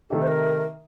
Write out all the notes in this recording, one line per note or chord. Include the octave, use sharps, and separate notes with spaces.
C3 D#3 A3 D#4 G4 A4
C5
A#4